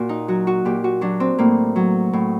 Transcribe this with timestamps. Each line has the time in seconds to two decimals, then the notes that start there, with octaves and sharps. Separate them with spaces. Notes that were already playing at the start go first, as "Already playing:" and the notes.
Already playing: A#2 F#4
0.09 D#4
0.28 F#3 F#4
0.47 F#4
0.65 A#2 G4
0.84 F#4
1.01 F#3 D4
1.20 C4
1.39 A2 A#3
1.76 F#3
2.13 A2